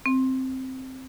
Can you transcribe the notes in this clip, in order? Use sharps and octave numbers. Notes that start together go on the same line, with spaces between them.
C4